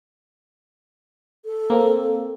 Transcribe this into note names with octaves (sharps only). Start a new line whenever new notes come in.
A4
A#3 C4